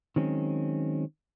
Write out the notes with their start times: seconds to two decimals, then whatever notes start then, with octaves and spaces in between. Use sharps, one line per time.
0.16 D#3 F#3 G#3 C4 C#4